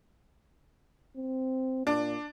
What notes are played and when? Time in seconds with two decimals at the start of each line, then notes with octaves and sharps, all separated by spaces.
1.16 C4
1.87 A#2 D4